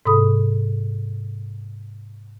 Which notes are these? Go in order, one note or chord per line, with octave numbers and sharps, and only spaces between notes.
G#2 C3 A4 B5 D#6